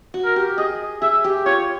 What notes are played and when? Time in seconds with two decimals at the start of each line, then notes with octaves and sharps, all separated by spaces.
0.14 F#4
0.25 A#4
0.36 G4
0.58 G#4 D#5
1.02 G#4 E5
1.24 G4
1.46 F4 C#5